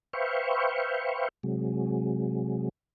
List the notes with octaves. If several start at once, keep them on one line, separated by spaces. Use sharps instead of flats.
B4 C5 E5 F5 G5 C#6
C3 F#3 G#3